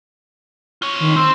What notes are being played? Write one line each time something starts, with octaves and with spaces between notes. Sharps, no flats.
F4 C#5
D#3
C4 E6